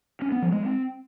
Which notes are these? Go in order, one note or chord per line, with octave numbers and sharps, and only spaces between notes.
C#4
B3
F3
G#3
C4